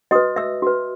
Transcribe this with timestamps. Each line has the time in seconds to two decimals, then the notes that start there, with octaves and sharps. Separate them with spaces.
0.11 F#4 B4 D#5 D#6
0.36 E5 E6
0.62 F#4 B4